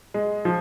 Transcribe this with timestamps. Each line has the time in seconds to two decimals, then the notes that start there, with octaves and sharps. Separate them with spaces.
0.14 G#3
0.45 F3